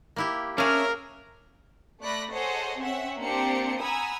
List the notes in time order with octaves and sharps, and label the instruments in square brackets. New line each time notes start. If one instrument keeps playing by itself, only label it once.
[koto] A#3 E4 G4
[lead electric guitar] C#4 D4 [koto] G#4 F5 [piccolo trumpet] A#4 [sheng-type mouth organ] C#5 E5 F6
[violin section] A3 D5 B5 F#6 A#6
G#4 A4 C5 C#5 D#5 F#5
C4 C#4 E5 F#5
A#3 C4 D4 G4 C5 C#7
F#5 G#5 A#5 B5 D#6 E6